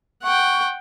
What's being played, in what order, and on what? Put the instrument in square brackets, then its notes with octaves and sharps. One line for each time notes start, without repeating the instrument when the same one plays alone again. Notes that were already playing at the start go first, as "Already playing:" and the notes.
[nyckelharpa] F#5 G5 [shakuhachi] C#6